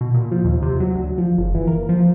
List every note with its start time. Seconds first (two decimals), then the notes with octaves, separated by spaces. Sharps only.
0.01 B2
0.14 A#2
0.31 F3
0.45 D#2
0.62 C3
0.80 F#3
0.95 D2
1.18 F3
1.38 F#1
1.55 E3
1.67 A#3
1.89 F3